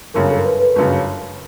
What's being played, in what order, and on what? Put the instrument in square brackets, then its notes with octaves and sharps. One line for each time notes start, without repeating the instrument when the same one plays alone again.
[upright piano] G1 F#2 C#3 [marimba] A#4
[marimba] A4
A#4
B4
B4
[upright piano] G1 F#2 C#3